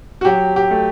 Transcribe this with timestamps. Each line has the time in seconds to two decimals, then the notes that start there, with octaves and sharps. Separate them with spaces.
0.21 F#4
0.25 F#3 G4
0.56 G4
0.71 A3